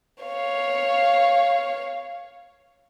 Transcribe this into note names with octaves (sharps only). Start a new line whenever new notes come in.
C#5 F5